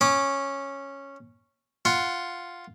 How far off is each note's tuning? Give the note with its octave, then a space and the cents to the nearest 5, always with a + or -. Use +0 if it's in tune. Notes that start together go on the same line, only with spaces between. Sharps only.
C#4 -5 D6 +30
F4 +0 F#5 +5